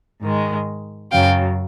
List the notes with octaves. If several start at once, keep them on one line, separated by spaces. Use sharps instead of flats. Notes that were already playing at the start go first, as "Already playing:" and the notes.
G#2 D#3 G#3
F#2 C#3 F#3 F5 G5